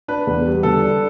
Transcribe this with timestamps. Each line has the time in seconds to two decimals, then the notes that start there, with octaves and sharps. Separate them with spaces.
0.08 D4 B4
0.27 E2
0.45 G3
0.63 D3 A4
0.82 D4